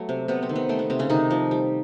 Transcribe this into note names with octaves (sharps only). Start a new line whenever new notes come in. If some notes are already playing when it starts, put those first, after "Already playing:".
Already playing: F#3 A3 B3
C3
C3 B3
C4
D#3
B3
A3 C4
B3
C3 C4
C#3 C#4
C3 D#3 D#4
F3
G3